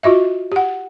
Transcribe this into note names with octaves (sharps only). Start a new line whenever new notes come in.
F4 F#4 D#5 E5
G4 F#5